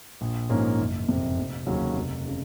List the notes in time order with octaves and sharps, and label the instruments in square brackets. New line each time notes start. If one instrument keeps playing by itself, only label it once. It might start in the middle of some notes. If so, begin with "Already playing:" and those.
[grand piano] A#1
G#2 F3 A#3 C#4
F#1
F2 C3
F1
D#2 C#3 F#3 C#4
F1
C#3